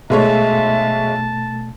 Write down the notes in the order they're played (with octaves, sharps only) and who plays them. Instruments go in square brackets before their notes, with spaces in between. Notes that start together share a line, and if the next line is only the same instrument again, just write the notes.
[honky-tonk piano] B1 G#3 C#5 [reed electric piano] B2 A3 [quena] E5 [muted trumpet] A5